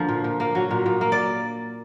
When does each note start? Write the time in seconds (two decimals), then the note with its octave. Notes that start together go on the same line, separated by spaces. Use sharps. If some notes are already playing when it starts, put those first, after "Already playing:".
Already playing: D3 F3 A#3
0.09 A#2
0.24 A#2
0.40 A#3
0.55 F#3
0.71 A#2
0.86 A#2
1.01 A#3
1.12 D5